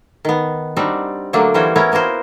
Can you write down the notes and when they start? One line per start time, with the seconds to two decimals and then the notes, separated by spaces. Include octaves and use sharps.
0.25 D#3 B3
0.76 G3 C4 D4 D#4 F#4
1.33 D3 F#3 A3 A#3 D4
1.54 E3 G3 C#4 F#4 C5
1.76 B3 C#4 E4 A#4 C#5
1.92 A#3 B3 F#4 A#4 C5